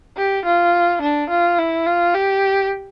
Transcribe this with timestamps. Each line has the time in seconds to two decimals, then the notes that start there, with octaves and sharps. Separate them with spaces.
0.17 G4
0.45 F4
1.02 D4
1.30 F4
1.59 E4
1.86 F4
2.15 G4